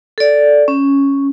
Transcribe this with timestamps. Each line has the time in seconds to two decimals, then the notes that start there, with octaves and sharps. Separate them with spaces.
0.18 A4 D5
0.68 C#4